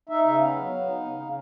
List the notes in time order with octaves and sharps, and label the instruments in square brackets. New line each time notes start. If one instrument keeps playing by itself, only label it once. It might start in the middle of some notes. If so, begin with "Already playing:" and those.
[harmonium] D#4 E5
C#3 E5
B3 F5
F#3
B3
D#4
C#3
C#3